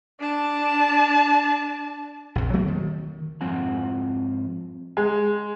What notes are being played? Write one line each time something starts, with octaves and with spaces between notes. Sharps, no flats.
D4 A5
A#1 F2
F#3 A3 A#3 C4
D#3
G#2 F3 C4 F4 F#5 G#5
G#3